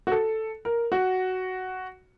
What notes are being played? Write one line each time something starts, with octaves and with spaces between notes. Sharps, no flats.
F#4
A4
A#4
F#4